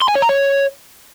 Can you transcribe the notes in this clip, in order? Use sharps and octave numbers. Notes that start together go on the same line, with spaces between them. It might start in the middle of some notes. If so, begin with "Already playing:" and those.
C6
G#5
C#5
A#5
C#5